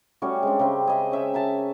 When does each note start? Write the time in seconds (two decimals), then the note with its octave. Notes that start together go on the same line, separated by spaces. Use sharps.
0.22 G3 A3 C#4 F#4
0.43 G#3 C4 D4
0.59 C#3 G3 C4
0.87 G#4 D#5 E5
1.12 C#4 E5 G5
1.33 A#4 E5 G#5 A5